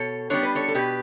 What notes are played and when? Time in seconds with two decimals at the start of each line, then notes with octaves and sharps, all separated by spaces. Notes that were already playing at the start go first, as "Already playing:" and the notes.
Already playing: B2 A4 C#5
0.30 G3 B3 D4 C#5
0.43 B4
0.55 A4 C#5
0.68 A4
0.75 B2 G4 B4